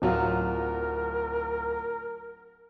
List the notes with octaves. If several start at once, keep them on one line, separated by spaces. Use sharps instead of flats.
D1 F#3 F4 A#4